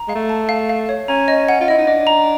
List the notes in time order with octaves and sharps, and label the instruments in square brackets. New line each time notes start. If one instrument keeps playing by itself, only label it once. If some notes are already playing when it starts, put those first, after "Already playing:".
Already playing: [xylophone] A#5
[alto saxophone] G#3 [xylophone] F5
[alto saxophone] A3
[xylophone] A5
F5
F5
C#5
[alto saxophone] C#4 [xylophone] A#5
[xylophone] D#5
F#5
[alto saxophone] F4
[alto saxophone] E4 [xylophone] D#5
[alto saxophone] D#4
[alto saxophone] D4 [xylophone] D#5
[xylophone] A#5